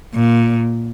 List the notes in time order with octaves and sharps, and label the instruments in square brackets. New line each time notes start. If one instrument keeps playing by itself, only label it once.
[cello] A#2